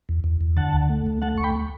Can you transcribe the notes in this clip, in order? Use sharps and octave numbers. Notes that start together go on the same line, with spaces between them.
E2
E2
E2
D3 F#5 A5
D2
A3
D2
A3 F#5 A5
D2 C#6
G5 B5